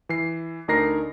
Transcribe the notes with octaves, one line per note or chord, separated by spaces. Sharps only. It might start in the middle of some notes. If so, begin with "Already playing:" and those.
E3 C7
D2 D4 D#4 A#4 A#6 C7